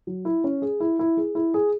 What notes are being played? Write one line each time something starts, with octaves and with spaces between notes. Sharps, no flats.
F#3
E4
C#4
G#4
E4
E4
G#4
E4
G#4